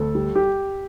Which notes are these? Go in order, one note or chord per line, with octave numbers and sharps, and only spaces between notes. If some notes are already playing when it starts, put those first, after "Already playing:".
Already playing: D2 A4
G3
G4